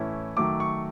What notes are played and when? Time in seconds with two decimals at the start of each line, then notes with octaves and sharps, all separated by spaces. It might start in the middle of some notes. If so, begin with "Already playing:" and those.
Already playing: A2 E3 A3 C#4 E4
0.37 D#3 F#3 A3 D6
0.60 C#6